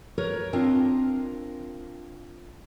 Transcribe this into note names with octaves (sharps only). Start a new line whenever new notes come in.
A#4 B4 C#5
C4 D4 F4 A#4 D#5